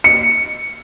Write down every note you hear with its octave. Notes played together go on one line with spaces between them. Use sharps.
C#7